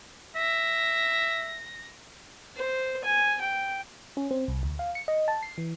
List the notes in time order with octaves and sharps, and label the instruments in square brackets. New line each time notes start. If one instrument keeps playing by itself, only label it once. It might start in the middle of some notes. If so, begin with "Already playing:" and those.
[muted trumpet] E5 [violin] A#6
[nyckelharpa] C5
G#5
G5
[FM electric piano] C#4
C4
C2
D2
F5
C#7
D#5
A5
C7
E3